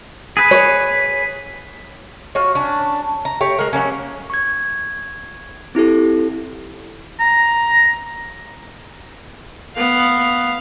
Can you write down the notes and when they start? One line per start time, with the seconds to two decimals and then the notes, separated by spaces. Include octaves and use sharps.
0.37 G#4 B4
0.51 C#5
2.35 F4 F#4 C#5
2.55 C#4 D4
3.25 A#5
3.41 A3 G4 C#5
3.58 G#3 A#4
3.73 F#3 A#3 C#4
4.30 C#6 G#6
5.75 C4 E4 G4 A4
7.20 A#5
9.76 B3 F5